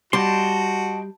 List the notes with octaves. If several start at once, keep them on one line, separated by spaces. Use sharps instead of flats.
G3 F#4 D#5 G5 A5 C6